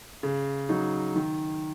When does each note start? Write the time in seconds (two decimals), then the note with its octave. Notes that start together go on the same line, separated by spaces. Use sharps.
0.23 C#3
0.69 F#3 D#4
1.16 D#3